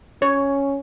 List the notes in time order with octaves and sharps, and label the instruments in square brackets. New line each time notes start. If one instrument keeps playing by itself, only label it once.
[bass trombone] C#4 [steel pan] C#5